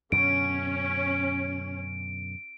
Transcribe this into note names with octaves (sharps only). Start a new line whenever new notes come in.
F#2 B2 D3 C#4 D7